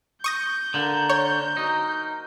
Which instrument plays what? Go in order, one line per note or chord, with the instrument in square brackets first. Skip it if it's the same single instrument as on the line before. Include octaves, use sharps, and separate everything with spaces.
[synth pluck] C#6 D#6 A#6 [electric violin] G6
[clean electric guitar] D3 [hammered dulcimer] A#3 A#5
[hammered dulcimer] C5 [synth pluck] C#5
[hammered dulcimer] F#3 A#4 [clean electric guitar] D#4